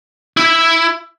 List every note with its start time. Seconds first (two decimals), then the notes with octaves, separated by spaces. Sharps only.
0.37 E4